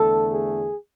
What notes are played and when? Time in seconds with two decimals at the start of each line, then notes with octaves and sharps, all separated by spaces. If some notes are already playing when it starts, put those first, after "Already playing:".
Already playing: E2 D3 A3 A4
0.32 G#4